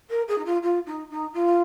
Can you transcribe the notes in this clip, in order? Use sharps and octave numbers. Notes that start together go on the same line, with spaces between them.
A#4
G#4
D#4
F4
F4
D#4
D#4
F4